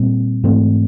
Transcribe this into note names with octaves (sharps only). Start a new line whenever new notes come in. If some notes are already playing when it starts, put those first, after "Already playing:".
Already playing: A#2 G3 C4
G#2 E3 A3 C4